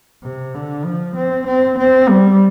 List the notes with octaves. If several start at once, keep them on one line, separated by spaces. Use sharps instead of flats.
C3
D3
F3
C4
C4
C4
G3